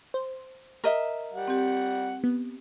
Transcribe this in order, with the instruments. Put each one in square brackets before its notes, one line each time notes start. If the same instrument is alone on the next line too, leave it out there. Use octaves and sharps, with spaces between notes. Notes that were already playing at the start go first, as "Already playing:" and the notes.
[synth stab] C5
[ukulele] A#4 D#5 E5
[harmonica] G3 F#5
[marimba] C4 G4
[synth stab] B3